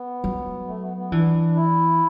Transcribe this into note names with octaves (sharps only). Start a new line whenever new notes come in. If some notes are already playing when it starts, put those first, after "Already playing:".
Already playing: B3
F#3
A3
B3
B3
E3 D4
E4